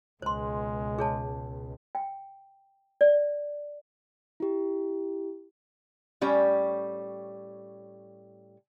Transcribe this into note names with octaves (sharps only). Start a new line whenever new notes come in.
C#2 B2 G#3 C5 C6
G#4 C#5 A5
G5
D5
E4 G4
A2 G3 C#4 G5